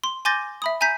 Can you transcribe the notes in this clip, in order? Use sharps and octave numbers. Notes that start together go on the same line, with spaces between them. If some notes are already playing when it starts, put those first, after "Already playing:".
C6
G#5 C6 D6 G6 A6 A#6
E5 B5 D#6
E5 G#5 A#5 G6 B6